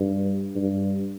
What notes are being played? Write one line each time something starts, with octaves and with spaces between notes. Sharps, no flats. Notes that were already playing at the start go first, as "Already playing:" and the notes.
Already playing: G2
G2